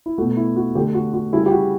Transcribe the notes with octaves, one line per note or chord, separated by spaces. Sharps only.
E4
B2 A3 F#4
E4
F#4
D3 A3 G4
F#4
F#4
C#3 G3 E4
G4
F#4